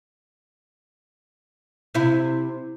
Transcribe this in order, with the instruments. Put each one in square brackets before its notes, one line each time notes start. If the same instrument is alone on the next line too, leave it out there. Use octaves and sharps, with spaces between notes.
[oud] C3 E4